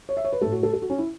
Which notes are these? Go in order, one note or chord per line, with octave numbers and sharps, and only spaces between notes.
C#5
E5
C#5
B4
A2 A3 A4
F#4
A4
A4
F#4
C#4
E4